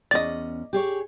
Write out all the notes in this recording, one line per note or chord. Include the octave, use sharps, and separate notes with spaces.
E2 C#4 D5 D#5 A6
G4 G#4 C#5